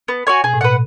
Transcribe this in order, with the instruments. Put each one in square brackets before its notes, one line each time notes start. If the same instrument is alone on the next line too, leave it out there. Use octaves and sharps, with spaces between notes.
[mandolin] B3
F#4 C#5 G#5
[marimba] B2 [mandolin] G#4
[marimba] A2
[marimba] B2 [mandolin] B4 F#5